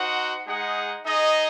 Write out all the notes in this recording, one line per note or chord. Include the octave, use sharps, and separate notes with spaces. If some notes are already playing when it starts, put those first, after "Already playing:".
Already playing: D#4 F#4 C5 F#5
G#3 D#4 G#4 D#5 F#5
D#4 G#4 D#5